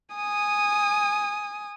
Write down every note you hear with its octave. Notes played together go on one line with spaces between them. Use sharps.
G#5 D#6